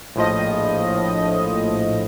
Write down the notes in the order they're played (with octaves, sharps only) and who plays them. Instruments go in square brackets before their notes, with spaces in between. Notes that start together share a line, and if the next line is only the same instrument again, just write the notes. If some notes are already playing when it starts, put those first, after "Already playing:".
[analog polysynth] A#1 A2 F3 D#5